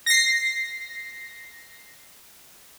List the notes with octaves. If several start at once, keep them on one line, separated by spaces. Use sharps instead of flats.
A#6 C7